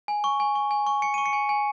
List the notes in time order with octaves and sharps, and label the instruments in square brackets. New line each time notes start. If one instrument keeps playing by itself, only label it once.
[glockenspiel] G#5
C#6
G#5
C#6
G#5
C#6
G#5 C#7
C#6 D#7
C#7
G#5
G#5